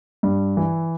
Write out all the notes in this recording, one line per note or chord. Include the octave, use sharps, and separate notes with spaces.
G2
E3